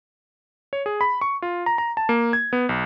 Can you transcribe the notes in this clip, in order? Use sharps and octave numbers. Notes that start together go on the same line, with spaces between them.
C#5
G#4
B5
C#6
F4
A#5
A#5
A5
A#3
G#6
B3
B1